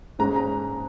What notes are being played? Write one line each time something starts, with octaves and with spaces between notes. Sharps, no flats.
G#2 G#3 C#4 A#5
A#5